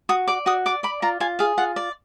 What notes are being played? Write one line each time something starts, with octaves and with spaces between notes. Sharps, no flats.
F#4 D#6
D5 D6
F#4 D#6
D5 D6
D5 B5
F4 A#5
F4 G#5
G#4 F5
F4 F#5
D5